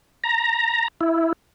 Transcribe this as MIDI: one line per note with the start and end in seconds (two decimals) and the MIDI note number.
0.24 0.88 82
1.01 1.33 64